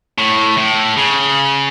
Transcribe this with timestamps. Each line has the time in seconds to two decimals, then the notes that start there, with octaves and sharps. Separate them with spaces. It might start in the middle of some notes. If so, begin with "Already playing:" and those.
0.18 A2
0.58 A2
0.97 C#3